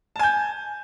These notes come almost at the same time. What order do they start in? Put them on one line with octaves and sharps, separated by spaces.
A5 G#5 G6